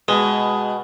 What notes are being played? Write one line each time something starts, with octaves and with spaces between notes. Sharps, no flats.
B2 G#3